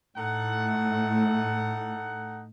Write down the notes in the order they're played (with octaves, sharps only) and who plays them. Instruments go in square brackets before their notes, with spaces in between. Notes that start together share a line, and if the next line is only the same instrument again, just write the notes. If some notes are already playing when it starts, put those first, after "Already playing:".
[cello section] A2 [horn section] D#4 A4 F#5